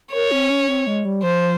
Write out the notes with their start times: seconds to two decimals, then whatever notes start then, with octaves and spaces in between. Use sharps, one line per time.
0.14 A#4 C#5
0.31 C4
0.50 C#4
0.68 C4
0.87 G#3
1.05 G3
1.23 F3 C5